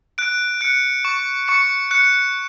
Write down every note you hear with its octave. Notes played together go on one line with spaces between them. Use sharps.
F#6 D7
F#6 C#7
C#6
C#6 C#7
F#6 C#7